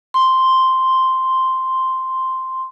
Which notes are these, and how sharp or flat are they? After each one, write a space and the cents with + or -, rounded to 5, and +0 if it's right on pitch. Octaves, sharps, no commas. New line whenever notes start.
C6 +0